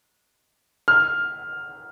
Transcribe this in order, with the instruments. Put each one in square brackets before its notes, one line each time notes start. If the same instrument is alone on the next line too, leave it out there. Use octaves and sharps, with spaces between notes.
[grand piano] F6